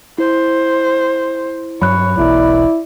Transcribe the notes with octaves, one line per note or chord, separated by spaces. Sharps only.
E4 C5
G2 F#3 C#5 B5 F#6
E1 B1 E2 E4 D5